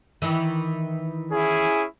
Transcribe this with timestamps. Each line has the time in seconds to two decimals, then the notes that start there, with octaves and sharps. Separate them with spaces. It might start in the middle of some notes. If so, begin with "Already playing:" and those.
0.22 D#3 E3
1.32 C#4 E4 G#4